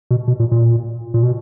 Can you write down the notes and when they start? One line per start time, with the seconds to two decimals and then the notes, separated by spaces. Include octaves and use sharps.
0.11 B2
0.28 B2
0.40 A#2
0.52 A#2
1.14 A#2
1.23 B2